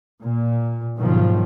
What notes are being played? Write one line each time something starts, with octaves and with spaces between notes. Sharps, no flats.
A#2
B1 G#2 D#3 F3